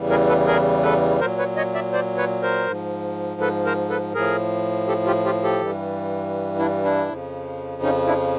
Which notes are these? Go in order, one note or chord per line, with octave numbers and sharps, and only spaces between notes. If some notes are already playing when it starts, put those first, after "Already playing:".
Already playing: E2 C#3 E3 G3
G#4 A#4
A4 B4
G#4 A#4
A4 B4
A#2 F#3 A#4 C5
B4 C#5
C#5 D#5
D5 E5
C5 D5
B4 C#5
A#4 C5
G#2 F3
A4 B4
A#4 C5
A4 B4
A2 F3 G#4 A#4
G4 A4
F4 G4
F4 G4
G4 A4
G2 E3 G3
D4 E4
D4 E4
F2 C#3 F3
C#4 D#4
D4 E4